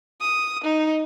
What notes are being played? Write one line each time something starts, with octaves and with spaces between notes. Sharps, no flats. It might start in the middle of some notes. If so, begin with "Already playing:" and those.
D#6
D#4